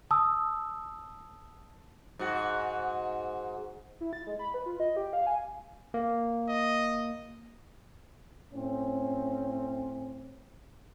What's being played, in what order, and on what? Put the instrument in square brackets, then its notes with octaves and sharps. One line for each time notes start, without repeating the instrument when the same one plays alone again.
[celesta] A5 D#6 E6
[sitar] G#2 F#4
[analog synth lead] E4
A6
G#3
B5
B4
F4
D#5
G4
F5
G#5
[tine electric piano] A#3
[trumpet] D#5
[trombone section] A2 C4 C#4